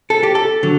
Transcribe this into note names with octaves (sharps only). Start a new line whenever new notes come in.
A4
G4
A4
D3 F#3